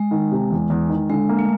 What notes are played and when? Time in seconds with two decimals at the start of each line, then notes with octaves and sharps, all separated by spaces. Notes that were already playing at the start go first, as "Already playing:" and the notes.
Already playing: G#3
0.11 D#3
0.32 C3
0.50 E2
0.70 E2
0.89 D#3
1.10 D3 G#3
1.29 A#3
1.39 A3